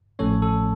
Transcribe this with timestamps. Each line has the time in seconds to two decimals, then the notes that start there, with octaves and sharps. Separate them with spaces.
0.19 A1 A2 F3 A3 C#4 A4 C#5
0.42 A4